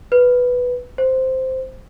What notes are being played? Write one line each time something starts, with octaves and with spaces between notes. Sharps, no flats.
B4
C5